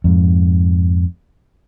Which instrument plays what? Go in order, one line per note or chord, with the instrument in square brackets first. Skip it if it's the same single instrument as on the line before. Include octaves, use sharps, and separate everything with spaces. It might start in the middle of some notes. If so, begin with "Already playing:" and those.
[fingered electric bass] F2 G#2